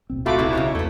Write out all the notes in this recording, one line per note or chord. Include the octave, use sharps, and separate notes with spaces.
D1 B1 C4
A3 F4 F#4 B5 D6
C3 G3 B3 E4
C#3 D#4 F4 C#5
E2 A3 E4 B4